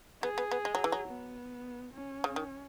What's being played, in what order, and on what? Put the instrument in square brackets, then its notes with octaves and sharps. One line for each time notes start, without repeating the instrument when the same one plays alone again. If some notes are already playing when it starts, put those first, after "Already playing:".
[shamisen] B3 [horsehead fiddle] G#4
[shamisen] B3
B3
G#3
F#3
E3
F#3
[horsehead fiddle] B3
C#4
[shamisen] C#3
D#3